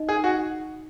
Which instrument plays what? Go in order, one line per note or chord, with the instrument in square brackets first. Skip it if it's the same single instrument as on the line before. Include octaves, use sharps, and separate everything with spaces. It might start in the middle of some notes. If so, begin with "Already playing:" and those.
Already playing: [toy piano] D#4 D#5
[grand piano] G#4
F#4